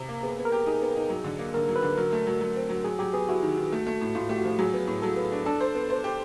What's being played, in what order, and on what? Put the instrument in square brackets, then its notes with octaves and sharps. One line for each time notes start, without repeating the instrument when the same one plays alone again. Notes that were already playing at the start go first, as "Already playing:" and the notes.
Already playing: [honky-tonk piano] C3
A#3
[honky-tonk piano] B3 [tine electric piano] G#4
[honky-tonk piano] B3
[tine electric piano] A#4
[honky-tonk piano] G4
[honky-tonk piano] D#4 [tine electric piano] G#4
[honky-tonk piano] B3
D#4
F#3
D3
A#3
[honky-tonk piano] D3 [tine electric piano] A#4
[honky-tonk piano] F#3
[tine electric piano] B4
[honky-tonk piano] D3
[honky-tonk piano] F#3 [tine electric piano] A#4
[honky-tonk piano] A3
F#3
F#3
C4
F#3
[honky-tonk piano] F#3 [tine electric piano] G#4
[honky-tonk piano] F#3 [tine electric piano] G4
[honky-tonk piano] B3 [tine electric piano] G#4
[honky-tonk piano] E4 [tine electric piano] F#4
[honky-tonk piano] D#3
D#3
A3
A3
A2
[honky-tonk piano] A2 [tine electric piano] F4
[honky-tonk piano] A3 [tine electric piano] G4
[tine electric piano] F#4
[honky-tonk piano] F3
[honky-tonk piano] F#3 [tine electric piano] G#4
[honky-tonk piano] B3
A2
[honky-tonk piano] F#3 [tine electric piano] A4
[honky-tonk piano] B3
D4
[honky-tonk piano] D4 [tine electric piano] A4
[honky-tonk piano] C5
B3
C5
G4